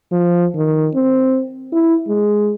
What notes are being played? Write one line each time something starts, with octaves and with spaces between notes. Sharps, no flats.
F3
D#3
C4
E4
G#3